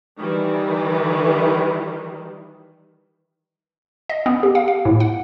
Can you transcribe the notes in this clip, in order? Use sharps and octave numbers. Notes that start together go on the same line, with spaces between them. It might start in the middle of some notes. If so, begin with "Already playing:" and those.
D#3 E3 G3
D#5
B3
G4
F5
F5
A2
F#5